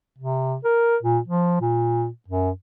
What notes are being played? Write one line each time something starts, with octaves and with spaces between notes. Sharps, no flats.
C3
A#4
A#2
F3
A#2
F#2